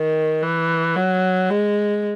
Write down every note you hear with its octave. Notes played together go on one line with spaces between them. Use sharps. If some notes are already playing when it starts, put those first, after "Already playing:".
Already playing: D#3
E3
F#3
G#3